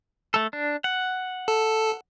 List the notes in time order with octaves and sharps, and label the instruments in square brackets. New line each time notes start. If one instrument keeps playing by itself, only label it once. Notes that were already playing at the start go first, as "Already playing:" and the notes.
[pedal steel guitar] A3 A4
D4
F#5
[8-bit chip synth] A4